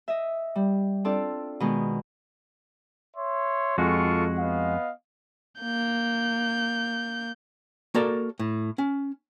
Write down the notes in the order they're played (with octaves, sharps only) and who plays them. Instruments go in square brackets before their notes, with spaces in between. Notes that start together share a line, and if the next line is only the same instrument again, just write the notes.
[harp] D#5 E5
G3
C4 D4 F4 A4 D5
B2 D#3 G#3
[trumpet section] C#5 E5 C6
[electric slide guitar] F2 G#3 F#4 [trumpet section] F4 A4 C#6
[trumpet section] B3 D#5 F5
[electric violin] A#3 G6
[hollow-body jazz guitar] A#3 F#4 A4 A#4 D5
A2
C#4